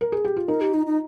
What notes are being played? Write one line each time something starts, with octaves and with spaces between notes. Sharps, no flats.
A#4
G#4
G4
F4
D#4 A#4
G4
D#4
D#4